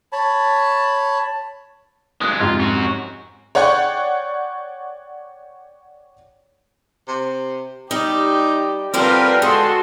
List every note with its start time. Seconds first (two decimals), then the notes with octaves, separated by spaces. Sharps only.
0.12 C#5 A5 B5
2.21 G2 G#3 D#6 F#6
2.39 F2 G#2 C3 F4
2.60 C#4 F#4
3.55 C#5 D5 F#5 G5 C#6
7.08 C3
7.91 G3 D#4 G4
8.94 D3 G3 C4 F4 A#4 B4 F5 G5
9.42 D3 G#3 F#4 A4 C6